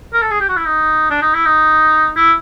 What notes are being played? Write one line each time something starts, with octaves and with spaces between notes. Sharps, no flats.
A#4
A4
G#4
G4
F#4
E4
D#4
D4
D#4
E4
D#4
E4